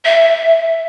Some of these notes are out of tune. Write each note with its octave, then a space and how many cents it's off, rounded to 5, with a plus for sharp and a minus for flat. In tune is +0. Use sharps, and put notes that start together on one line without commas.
E5 +5